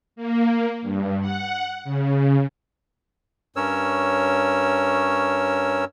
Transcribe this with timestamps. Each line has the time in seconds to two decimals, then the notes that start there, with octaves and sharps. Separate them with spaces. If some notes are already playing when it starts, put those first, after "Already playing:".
0.16 A#3
0.82 G2
1.21 F#5
1.84 C#3
3.56 G2 C#4 A#4 C#5 E6